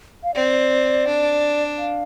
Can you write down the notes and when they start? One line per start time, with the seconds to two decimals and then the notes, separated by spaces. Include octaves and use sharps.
0.24 F5
0.35 C4 D5
1.07 D4
1.78 F5